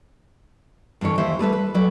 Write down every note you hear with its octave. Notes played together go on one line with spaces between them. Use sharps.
G2 D3 E3 C#5
D#2 E3 G4 C5 E5
G3 A3 B4 E5
B4
F#3 A4 B4 D5